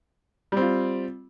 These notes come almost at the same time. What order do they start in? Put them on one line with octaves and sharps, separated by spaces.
G3 C4 F4